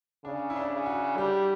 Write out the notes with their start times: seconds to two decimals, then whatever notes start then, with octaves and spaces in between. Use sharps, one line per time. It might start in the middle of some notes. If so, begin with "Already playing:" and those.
0.24 C#3 D4
0.50 E4
0.56 D4
0.70 C#3
0.86 F#4
1.17 G3 G4